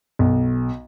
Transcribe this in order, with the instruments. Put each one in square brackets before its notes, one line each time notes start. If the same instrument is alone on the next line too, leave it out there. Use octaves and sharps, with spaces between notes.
[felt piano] B1